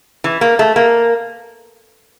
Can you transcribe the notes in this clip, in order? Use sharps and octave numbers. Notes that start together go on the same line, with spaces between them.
E3
A#3
A3
A#3